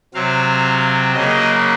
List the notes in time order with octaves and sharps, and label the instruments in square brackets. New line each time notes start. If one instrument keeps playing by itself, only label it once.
[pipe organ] C3 F#3 C4 F5
C#3 F#3 A#3 D#5